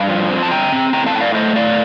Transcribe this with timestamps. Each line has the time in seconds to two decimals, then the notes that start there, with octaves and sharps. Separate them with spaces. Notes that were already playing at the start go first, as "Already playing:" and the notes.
Already playing: G2 F5 A5
0.09 F3
0.30 C4
0.43 A5
0.51 G2 G5 A#5
0.72 C4
0.93 A2 G5 A#5
1.06 F5 A5
1.14 A2 G5
1.21 D5 F5
1.35 A3 C5 D#5
1.55 A2 D5 F5